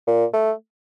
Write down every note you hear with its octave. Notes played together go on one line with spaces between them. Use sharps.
A#2
A3